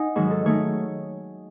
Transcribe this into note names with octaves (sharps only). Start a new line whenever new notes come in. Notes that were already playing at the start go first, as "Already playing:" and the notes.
Already playing: D#4 F#5 G#5
G#2 D#3 F#3 C#5
A4
D#3 A3 D#4 C#5